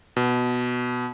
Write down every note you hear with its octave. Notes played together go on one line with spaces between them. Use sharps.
B2